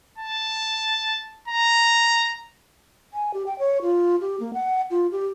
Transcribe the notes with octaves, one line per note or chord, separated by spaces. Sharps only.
A5
A#5
G#5
G4
G5
C#5
F4
G4
A#3
F#5
F4
G4